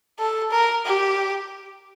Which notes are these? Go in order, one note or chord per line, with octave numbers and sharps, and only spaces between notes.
A4
A#4
G4